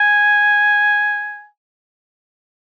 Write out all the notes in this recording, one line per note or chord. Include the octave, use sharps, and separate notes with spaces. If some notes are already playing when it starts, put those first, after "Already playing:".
Already playing: G#5